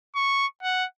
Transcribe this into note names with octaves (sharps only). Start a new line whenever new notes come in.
C#6
F#5